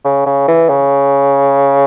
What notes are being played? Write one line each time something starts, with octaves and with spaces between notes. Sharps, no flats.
C#3
C#3
E3
C#3